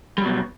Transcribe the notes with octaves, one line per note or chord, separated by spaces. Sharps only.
B2 F#3 G3